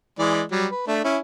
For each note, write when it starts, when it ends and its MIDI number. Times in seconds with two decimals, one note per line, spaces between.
0.19 0.42 52
0.19 0.42 56
0.19 0.42 74
0.51 0.66 54
0.51 0.66 55
0.71 0.83 71
0.87 1.02 57
0.87 1.02 62
1.04 1.18 61
1.04 1.18 64